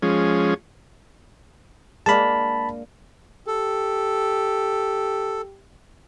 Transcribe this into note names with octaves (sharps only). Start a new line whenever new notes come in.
F3 G#3 C#4
G#3 A#3 D4 A5 B5
G4 A4